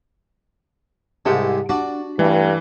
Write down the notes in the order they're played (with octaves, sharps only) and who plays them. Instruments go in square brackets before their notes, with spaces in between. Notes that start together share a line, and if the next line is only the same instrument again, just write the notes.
[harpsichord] C2 G#2 G#3 [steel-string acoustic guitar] G4 F#5 A5
[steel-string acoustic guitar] D4 [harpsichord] F#4 D5
[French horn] G2 [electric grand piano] E3 [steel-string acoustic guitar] A3